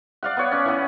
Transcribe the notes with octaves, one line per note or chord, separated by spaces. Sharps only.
D5 F5 F#5
B3 C#5
C#4 D5
E3 B3